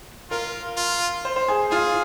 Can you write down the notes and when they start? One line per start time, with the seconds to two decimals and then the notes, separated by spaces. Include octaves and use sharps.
0.31 F4 A#4
0.77 F4
1.25 C5
1.36 C5
1.48 G#4
1.71 F4 G#4